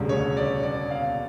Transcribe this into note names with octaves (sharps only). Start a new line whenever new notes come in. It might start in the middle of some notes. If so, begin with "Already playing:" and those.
Already playing: E1 D2 C#3 G3
C#5
D5
D5
F5